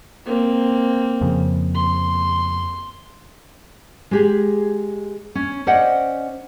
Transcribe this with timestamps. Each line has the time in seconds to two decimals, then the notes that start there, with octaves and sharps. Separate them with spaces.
0.26 A#3 C4
1.21 F2 C#3
1.75 C6
4.11 G#3 G4 G#4
5.35 C#4
5.67 C#4 C5 D5 D#5 F#5